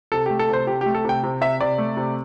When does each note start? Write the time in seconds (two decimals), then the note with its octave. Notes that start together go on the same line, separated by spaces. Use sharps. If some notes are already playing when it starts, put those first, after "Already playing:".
0.12 C3 A4
0.26 A3 G4
0.39 A4
0.49 C3 C5
0.67 C3 G4
0.81 G4
0.86 A3
0.95 A4
1.04 C3 G5
1.23 C3
1.41 C3 E5
1.60 C3 D5
1.78 A3
1.97 C3